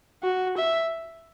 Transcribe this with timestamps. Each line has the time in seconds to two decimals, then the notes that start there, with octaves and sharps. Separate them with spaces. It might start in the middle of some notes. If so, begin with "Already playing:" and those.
0.23 F#4
0.58 E5